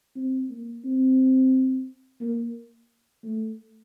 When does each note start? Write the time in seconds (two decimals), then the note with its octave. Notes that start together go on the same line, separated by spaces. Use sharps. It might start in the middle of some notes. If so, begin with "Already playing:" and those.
0.16 C4
0.49 A#3
0.85 C4
2.20 A#3
3.24 A3